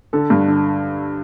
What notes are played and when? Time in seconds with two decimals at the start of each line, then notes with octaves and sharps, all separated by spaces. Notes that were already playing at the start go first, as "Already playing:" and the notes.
0.13 D3 A4
0.30 G2
0.48 D3